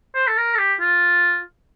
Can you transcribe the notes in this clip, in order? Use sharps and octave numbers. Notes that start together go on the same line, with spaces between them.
C5
A4
A#4
A4
G4
F4